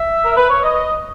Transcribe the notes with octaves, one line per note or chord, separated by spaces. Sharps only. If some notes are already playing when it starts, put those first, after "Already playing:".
Already playing: E5
A#4
B4
C#5
D#5